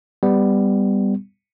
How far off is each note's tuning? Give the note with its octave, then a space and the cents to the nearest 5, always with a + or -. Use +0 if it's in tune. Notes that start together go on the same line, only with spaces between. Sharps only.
G3 +10 B3 +20